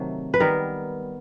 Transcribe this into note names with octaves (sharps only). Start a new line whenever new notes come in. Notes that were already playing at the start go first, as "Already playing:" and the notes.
Already playing: C3 D#3 F#3 A3
B4
D#3 G3 B3 A#4